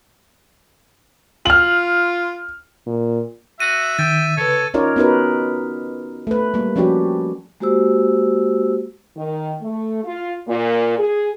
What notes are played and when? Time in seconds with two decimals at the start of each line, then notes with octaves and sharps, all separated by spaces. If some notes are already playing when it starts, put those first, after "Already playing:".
1.46 F4 F6 F#7
2.87 A#2
3.60 F#4 E5 D#7
3.99 D#3 G5 E6 A6
4.37 C#3 A4 B4 C#5
4.74 C#4 D#4 F4 A#4 C#5 D5
4.96 B3 C#4 D#4 F#4 A#4 B4
6.27 A3 B4
6.54 G3 A#3
6.76 F3 C#4 D4 F#4 G4
7.60 G#3 A#3 F#4 G4 C5 E6
9.17 D#3
9.61 A3
10.04 F4
10.48 A#2
10.98 G#4